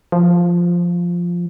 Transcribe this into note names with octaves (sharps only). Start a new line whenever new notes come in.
F3